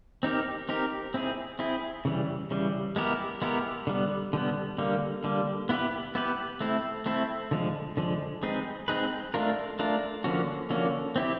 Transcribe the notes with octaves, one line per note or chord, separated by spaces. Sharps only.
C4 D#4 G4 A#4
C4 D#4 G4 A#4
C4 E4 G#4
C4 E4 G#4
C#3 E3 G3
C#3 E3 G3
G#3 B3 E4 G4 A#4
G#3 B3 E4 G4 A#4
D3 G3 B3
D3 G3 B3
D3 G3 A#3
D3 G3 A#3
B3 E4 G4 B4
B3 E4 G4 B4
A3 C4 E4
A3 C4 E4
D3 F3 G#3
D3 F3 G#3
G#3 C4 D#4 G#4 B4
G#3 C4 D#4 G#4 B4
A3 D4 F4 A#4
A3 D4 F4 A#4
D3 F3 A#3 C#4 F#4
D3 F3 A#3 C#4 F#4
C4 E4 G4